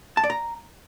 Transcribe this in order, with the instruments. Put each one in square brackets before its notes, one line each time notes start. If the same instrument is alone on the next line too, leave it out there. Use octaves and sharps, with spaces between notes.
[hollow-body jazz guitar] A5
D5
A#5